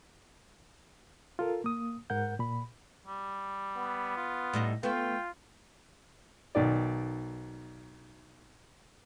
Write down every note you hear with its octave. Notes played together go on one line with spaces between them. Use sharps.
F4 A4 A#4
A#3 D#6
G#2 A#4 F#5 G6
A#2 B5
G3
B3
F4
A2 G3 D#4
A3 B3 F4 G5
B1 D#3 D5